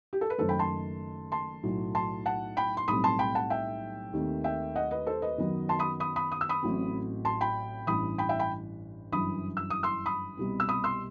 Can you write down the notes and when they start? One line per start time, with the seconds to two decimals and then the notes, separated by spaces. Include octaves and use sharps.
0.13 G4
0.21 A4
0.30 B4
0.38 F#1 F#2 D#3 A3 A4 C5
0.49 G5 B5
0.59 A5 C6
1.32 A5 C6
1.63 B1 A2 F#3
1.95 A5 C6
2.26 F#5 A5
2.57 G5 B5
2.77 C6
2.88 B1 A2 G3 C4 B5 D#6
3.04 A5 C6
3.19 G5 B5
3.35 F#5 A5
3.50 E5 G5
4.13 D#2 D#3 A3 C4
4.44 E5 G5
4.76 D#5 F#5
4.91 B4 D#5
5.07 A4 C5
5.22 B4 D#5
5.38 F#2 D#3 F#3 B3
5.69 A5 C6
5.79 B5 D#6
6.00 B5 D#6
6.16 B5 D#6
6.32 D#6
6.41 E6
6.49 B5 D#6
6.63 A1 A2 F#3 C4
7.25 A5 C6
7.41 G5 B5
7.87 A1 G2 E3 B5 D#6
8.18 G5 B5
8.29 E5 G5
8.39 G5 B5
9.12 G1 F#2 E3 B5 D#6
9.57 E6
9.70 D#6
9.83 C6 E6
10.06 B5 D#6
10.37 C2 B2 G3 C4
10.60 E6
10.69 B5 D#6
10.84 C6 E6